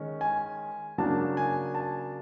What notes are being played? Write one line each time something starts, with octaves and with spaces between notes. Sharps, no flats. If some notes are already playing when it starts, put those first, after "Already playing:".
Already playing: D#3 G#3 C#4
G#5
C#3 F#3 A#3 D4 A5
G#5
A5